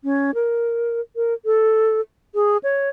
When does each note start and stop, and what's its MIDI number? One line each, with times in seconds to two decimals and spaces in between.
0.04 0.31 61
0.34 1.00 70
1.16 1.34 70
1.45 2.01 69
2.35 2.57 68
2.63 2.89 73